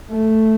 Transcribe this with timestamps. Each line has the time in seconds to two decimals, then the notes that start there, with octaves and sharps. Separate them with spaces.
0.11 A3